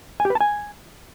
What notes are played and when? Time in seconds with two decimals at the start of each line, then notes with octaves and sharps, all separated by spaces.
0.20 G#5
0.25 G4
0.30 B4
0.35 A5
0.41 G#5